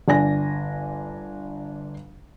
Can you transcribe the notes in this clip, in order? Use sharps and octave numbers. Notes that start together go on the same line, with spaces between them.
G1 D4 G#5 A#6